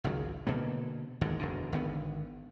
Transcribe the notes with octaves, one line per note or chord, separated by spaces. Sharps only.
G#1 C#2 C#3 F#3
B2 D3 A#3
G#1 D#2 G#2 D3
E1 F#2 D3
G#1 D3 B3